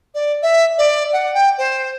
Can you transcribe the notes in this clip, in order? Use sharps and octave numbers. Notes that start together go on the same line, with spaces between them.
D5
E5
D5
F#5
G5
C5